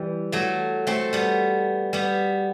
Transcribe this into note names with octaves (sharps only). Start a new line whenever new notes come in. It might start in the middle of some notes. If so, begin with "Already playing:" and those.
Already playing: E3 G3
F#3 A3
A3 C4
G3 B3
G3 B3